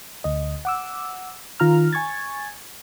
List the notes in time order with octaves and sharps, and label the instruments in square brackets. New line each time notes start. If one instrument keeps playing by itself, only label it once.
[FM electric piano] D2 D#5
F#5 D6 E6
D#3 F4 A#5 F6
G#5 C#6 G#6 A6